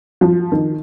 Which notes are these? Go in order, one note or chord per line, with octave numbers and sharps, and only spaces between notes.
F3
D#3